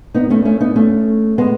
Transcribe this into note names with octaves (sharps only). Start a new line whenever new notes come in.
B3 D#4
A3 C#4
A3 C#4
B3 D#4
A3 C#4
G#3 B3